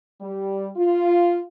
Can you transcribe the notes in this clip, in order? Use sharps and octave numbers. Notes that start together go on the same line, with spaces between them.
G3
F4